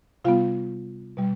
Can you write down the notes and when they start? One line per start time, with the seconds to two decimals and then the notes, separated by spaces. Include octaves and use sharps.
0.25 C3 G3 B3 F4 F5
1.17 B2 G3